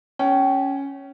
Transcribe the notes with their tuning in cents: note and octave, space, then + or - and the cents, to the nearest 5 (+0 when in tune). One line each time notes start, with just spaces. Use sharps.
C#4 +0 G5 -30